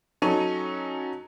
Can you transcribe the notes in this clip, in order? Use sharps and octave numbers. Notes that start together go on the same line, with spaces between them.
F#3 C#4 D#4 A4 C#6 D#7